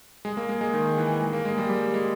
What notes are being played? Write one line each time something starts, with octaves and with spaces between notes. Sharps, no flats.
G#3
A#3
G#3
G#3
D#3
E3
G#3
A#3
G#3
G3
G3
G#3